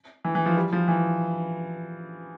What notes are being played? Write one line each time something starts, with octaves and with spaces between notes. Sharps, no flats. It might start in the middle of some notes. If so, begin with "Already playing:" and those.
E3
E3
F3
G3
F3
E3